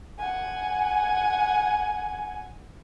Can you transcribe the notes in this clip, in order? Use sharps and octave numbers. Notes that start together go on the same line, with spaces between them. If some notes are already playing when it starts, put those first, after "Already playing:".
F#5 G#5